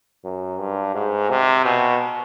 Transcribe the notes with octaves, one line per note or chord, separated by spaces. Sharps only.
F#2
G2
G#2
C3
B2